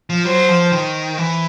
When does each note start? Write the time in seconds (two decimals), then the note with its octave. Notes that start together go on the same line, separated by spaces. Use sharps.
0.10 F3
0.25 F#3 C5
0.49 F3
0.72 D#3
1.18 E3